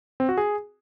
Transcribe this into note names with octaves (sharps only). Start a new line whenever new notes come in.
C4
F#4
G#4